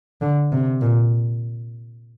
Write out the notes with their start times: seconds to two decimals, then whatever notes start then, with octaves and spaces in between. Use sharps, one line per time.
0.21 D3
0.52 C3
0.81 A#2